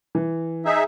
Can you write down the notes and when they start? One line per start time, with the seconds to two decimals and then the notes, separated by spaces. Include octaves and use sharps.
0.15 E3
0.65 D#4 G#4 E5